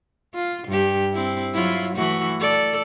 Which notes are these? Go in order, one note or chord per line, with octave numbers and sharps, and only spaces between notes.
F4
G2 G4
C4 E4
F#3 E4 F4
E3 A3 F#4
A4 D5